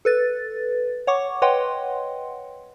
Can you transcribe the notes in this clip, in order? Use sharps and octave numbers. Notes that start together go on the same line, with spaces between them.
A4 B4 A6
C#5 F#5 C#6 D6
B4 C#5 D#5 F#5 G5 C6